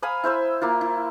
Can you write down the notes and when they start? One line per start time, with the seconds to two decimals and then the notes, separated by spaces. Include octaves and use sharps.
0.02 F5 G#5 B5 D#6
0.24 E4 C5 E5 E6
0.61 A#3 E4 F4
0.81 E4